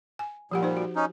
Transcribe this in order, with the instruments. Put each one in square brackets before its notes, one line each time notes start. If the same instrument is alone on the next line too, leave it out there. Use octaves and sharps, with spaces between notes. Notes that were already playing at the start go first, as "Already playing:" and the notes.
[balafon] G#5
[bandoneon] A#2 G3 [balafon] F3 G4 F#5
[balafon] D#4 C5
F#4
[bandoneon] C#4 D#4